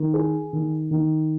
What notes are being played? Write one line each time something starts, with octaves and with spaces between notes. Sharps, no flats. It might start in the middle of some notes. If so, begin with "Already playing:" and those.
Already playing: D#3
G#4
D#3
D#3